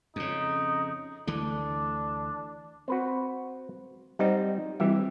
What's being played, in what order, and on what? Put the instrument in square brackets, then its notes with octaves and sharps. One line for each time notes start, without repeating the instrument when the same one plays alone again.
[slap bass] F2 C#3 [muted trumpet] D#4
[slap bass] D2 E3 A3 [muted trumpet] D4
[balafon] C4 [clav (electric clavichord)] F#4 B4 C5
[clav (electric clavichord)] G3 C4 D#4 [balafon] C5 D#5 F#5
[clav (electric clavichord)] E3 G4 E5 [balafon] G3 C4